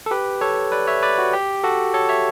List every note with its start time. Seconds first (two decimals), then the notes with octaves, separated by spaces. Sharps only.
0.06 A4
0.11 G4 B4
0.41 A4 C#5
0.72 B4 D5
0.87 C#5 E5
1.02 B4 D5
1.18 F#4
1.33 G4
1.64 F#4 A4
1.94 A4 C#5
2.09 C#5 E5